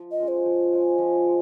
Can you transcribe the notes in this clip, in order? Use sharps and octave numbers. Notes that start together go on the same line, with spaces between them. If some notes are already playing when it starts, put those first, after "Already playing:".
Already playing: F3
D#5
G#3 C#4 F4
C5
F3
G#3 C#4 F4
F3
G#3